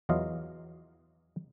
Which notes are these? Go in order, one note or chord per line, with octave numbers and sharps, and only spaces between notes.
E2 E3 F#3 F4 D#5 F5